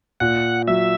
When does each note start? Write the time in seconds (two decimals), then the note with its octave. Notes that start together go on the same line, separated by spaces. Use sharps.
0.20 A#2 F#5
0.67 F#3 E5